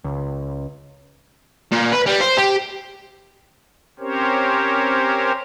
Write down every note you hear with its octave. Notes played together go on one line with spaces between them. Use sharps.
C#2
A#2
B4
G3
C5
G4
C4 C#4 G4 A#4 C5 C#5